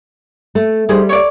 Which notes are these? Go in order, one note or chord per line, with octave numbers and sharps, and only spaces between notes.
A3
G3 D#4 G#4 C5
C#5 D5